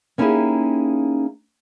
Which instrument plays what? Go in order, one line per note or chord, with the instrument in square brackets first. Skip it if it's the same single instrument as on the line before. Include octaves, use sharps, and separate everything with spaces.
[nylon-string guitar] A#3 C#4 D#4 E4 G4 G#4